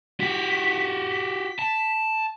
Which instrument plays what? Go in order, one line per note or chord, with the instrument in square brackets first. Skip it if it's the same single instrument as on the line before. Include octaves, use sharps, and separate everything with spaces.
[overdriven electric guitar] F#4 G4 [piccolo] B6
[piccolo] B6
[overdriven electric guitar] A5